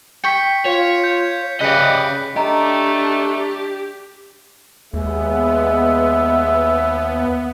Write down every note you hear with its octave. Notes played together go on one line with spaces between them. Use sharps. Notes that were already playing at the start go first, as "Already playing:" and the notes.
G5 C#6 B6 C#7
F4 C#5
G6
C#3 G4 B4 D5 D#5 F#6 B6 C#7
A3 D4 G4 D#5 A#5
D#2 G#3 B3 E5